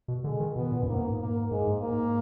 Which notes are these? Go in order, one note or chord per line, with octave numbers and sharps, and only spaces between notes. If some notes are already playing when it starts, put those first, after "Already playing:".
B2
D3 G#3
D#3
B2 B3
A#2
F#2
G#2 A#3
A#3
G#2 G#3
G#2
A#3